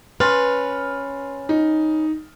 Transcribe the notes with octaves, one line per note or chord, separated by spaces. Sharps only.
C#4 B4 C6 F6 A6
D#4